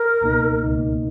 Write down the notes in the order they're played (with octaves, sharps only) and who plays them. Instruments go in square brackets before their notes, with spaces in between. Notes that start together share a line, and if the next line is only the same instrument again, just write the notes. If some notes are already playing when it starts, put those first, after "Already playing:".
Already playing: [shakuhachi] A#4
[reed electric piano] C#2 B2 A#3 D#4
C#2 B2 A#3 D#4